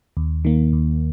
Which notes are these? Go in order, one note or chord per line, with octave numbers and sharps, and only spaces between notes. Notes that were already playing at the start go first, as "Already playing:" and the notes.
D#2
D#3 A#3
D#2